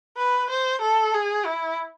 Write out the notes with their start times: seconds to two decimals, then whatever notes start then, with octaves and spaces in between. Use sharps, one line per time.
0.17 B4
0.50 C5
0.82 A4
1.14 G#4
1.46 E4